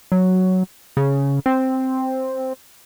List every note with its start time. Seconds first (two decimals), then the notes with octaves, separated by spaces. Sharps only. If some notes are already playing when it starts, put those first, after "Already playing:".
0.12 F#3
0.97 C#3
1.46 C4